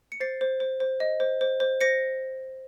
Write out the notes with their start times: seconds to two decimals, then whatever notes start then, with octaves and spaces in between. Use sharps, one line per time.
0.12 C#7
0.20 C5 A6 C7
0.41 C5
0.60 C5
0.80 C5
1.00 D#5
1.20 C5
1.41 C5
1.60 C5
1.81 C5 A#6 C#7